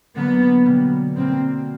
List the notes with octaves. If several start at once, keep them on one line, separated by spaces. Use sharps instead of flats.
D3 F#3 A#3 B3
B2 G3 A#3
B2 G3 A#3 C4